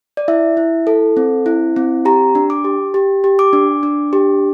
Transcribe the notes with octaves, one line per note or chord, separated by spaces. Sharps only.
D5
E4 E5
E4
A4
C4
E4
C4
G4 A#5
D4
D6
G4
G4
G4
D6
D4
D4
G4